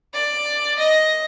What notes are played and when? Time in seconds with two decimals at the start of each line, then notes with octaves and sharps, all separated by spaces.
0.13 D5
0.79 D#5